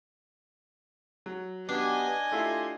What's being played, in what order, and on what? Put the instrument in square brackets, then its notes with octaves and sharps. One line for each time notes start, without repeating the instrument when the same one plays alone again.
[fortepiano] F#3
[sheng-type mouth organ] B3 G4 [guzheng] D4 [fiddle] D#5 G#5
[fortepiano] A3 E4 F4 [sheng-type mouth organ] G4 C6